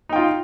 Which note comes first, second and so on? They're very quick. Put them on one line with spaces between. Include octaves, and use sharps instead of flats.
D#4 G5 F4